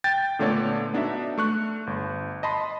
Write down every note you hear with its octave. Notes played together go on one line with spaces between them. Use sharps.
G5 G6 A6
A#2 D3 A3 B3 C#5 D5
B3 D4 D#4 F#4 E5
A3 C#6 F#6
G1
D#5 A5 B5 C6